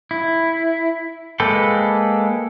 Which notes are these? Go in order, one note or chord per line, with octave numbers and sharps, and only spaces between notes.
E4
G#3 A#3 A4 B4 G5